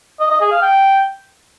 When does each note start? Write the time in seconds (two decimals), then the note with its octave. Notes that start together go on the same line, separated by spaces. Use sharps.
0.20 D#5
0.30 D#5
0.41 G#4
0.51 F5
0.62 G5